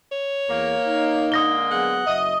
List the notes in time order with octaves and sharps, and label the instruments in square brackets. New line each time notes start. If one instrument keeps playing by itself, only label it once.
[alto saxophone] C#5
[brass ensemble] E2 [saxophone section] A#3
[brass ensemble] D#4
[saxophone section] D3 G#3 A#3 [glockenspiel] D#6 A#6 G7
[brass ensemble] F#3 B3 G#4 [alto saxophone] F#5
[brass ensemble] F#1 F#2 E5 [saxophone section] D#5